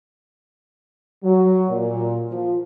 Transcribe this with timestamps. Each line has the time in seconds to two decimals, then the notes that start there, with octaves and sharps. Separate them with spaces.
1.24 F#3
1.70 A#2
2.31 F3